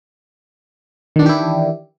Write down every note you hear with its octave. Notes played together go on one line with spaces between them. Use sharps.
D#3 E3 D4 E4 G4